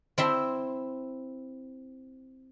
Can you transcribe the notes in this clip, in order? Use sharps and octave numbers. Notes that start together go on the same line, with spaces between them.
C4 E4 E5 C6